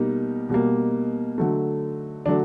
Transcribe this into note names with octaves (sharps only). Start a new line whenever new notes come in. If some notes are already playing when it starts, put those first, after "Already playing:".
Already playing: B2 G3 A#3 D#4
B2 G3 A#3
D3 F#3 A3
D3 F#3 A3 D4